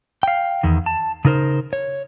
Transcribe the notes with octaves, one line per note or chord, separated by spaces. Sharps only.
F5 G5
E2 D#3
A5
C#3 D#4 A#4 C5
C#5